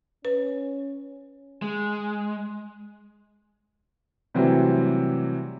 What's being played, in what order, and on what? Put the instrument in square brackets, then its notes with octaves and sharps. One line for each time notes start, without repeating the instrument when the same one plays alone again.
[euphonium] C#4 [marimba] B4
[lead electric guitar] G#3
[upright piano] C3 E3 F#3 G3 A3 C4